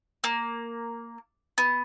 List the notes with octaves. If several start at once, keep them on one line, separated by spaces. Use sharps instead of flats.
A#3
B3